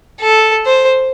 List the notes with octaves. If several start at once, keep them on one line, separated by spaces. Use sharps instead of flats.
A4
C5